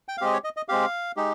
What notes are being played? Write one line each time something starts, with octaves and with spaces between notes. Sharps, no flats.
G5
F5
G#3 C4 G4 D#5
C#5
D#5
D#5
G#3 C4 G4 F5
G#3 D#4 G4